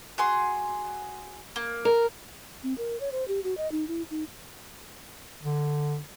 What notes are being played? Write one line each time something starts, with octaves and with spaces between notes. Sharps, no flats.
F#4 G#4 C6
A#3
A#4
C4
A#4
C#5
C5
G4
F#4
D#5
D#4
E4
D#4
D3